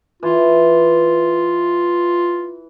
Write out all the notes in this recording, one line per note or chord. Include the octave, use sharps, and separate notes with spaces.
E3 F4